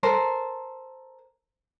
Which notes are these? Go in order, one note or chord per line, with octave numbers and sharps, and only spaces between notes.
A4 A#4 C5